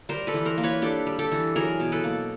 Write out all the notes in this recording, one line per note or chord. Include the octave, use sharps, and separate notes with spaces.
G3 A#4 C5
A4 B4
E3
A#4 C5
A#3
B4 C#5
D4 G4 A4
G3
G4 A4
E3
F#3 G#4 A#4
B2
A4 B4
A#3